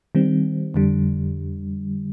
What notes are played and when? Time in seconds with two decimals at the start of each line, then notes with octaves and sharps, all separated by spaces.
0.15 D#3 G3 C4
0.74 F2 D3 G3